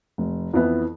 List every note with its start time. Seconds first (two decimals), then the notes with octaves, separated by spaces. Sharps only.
0.18 F1
0.53 F2 E3 B3 E4